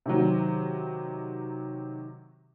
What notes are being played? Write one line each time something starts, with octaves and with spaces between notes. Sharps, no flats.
C3 D#3 F#3